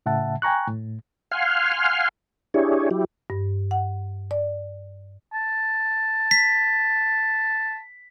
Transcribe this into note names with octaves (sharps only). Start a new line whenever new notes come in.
A2 C#3 E5 F#5 A5
G5 G#5 A#5 C#6 F#6
A2
F5 F#5 G#5 C6 F6
D4 E4 G4 G#4 C#5
F#3 E4 G4
G2
F#5
D5
A5
B6